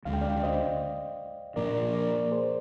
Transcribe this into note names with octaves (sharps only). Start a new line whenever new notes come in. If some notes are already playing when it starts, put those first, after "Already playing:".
D2 D3 G#3 F5
G5
D5 F5
C5 D#5
A#2 F3 A#3 D4 A#4 D5
A#4 D5
G#4 C5